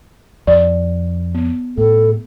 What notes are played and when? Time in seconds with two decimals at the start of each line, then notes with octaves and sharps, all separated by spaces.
0.47 F2 D5
1.35 B3
1.78 A2 A4